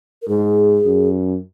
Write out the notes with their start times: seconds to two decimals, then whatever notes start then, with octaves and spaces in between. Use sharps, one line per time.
0.22 A#4
0.28 G#2 G#4
0.85 F#2